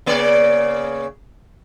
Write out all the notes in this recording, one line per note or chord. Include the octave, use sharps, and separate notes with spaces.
C#3 A#3 D5